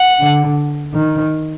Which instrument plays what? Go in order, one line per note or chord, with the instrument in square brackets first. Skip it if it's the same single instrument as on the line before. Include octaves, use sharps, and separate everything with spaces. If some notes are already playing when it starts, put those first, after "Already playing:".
Already playing: [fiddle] F#5
[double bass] D3
D#3